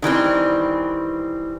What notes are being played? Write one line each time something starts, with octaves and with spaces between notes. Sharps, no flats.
D#3 E3 G3 C4